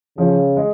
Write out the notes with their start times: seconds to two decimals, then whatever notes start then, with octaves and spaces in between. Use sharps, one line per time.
0.18 C#3 F3
0.57 G#3